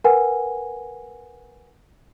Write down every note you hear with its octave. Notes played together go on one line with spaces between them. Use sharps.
A#4 B4 F#5 G#5